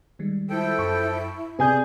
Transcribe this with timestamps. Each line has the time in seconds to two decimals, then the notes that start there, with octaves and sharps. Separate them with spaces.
0.19 D#3 G3 G#3
0.50 F3 E4 A4 G5
0.79 F#2 C#6
1.59 C3 G#4 B4 D5 G#5 G6